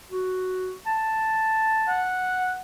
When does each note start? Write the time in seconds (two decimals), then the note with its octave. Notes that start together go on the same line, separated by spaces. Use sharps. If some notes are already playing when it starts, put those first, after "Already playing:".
0.11 F#4
0.86 A5
1.88 F#5